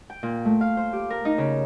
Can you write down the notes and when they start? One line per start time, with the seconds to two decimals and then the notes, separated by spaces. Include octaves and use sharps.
0.10 G5
0.23 A#2
0.45 A3
0.61 F5
0.77 C5
0.93 G4
1.10 A#4
1.25 D#4
1.38 C#3